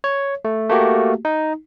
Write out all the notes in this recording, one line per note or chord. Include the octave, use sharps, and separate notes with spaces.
C#5
A3
A3 A#3 F#4 G4
D#4